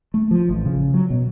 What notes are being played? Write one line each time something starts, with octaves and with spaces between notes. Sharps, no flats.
A3
F3
A1
C#3
F#3
B2